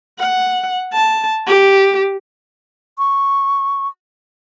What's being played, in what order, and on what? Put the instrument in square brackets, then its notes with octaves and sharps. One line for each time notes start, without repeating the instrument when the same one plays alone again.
[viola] F#5
A5
G4
[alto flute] C#6